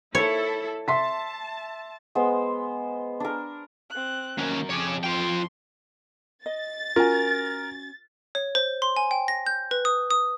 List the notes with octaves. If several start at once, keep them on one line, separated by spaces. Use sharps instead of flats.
E4 A4 C#5
E5 A5 C6 B6
G#3 B3 C5
D4 A#4
C4 F#6
D#2 F#3 C#4 A#4
F2 G#4 C#5 D6
F4 G5 C6
D#5 A6
C#4 F4 F#4 A#4 G#5
C#5
C5
C6
G#5
G5
A#6
G6
B4
D#6
D#6